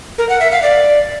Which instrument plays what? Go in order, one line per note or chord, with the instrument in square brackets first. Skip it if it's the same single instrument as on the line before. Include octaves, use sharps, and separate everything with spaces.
[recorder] A#4
F#5
E5
F5
D5